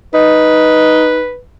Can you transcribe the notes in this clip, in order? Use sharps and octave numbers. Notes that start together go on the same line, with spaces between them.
D#4 B4